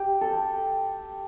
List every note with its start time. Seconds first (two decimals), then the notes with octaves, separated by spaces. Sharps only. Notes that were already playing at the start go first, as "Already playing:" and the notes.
Already playing: G4
0.21 A4